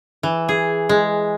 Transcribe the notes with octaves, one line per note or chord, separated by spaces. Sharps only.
E3
G#4
G#3